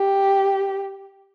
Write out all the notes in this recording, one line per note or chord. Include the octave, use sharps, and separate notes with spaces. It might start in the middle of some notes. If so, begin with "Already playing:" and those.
Already playing: G4